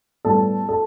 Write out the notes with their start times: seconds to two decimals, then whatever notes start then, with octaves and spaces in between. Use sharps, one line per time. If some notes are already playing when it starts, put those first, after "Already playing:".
0.25 A2 G3 B3 A4
0.69 A4